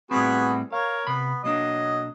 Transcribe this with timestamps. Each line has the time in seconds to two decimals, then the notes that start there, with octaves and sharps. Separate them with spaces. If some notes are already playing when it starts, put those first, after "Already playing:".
0.11 A2 G3 B3 C4 F#4 G#4
0.72 A#4 C#5 F5
1.07 C3 B3 B5
1.44 B1 F#3 A#3 D4 D#5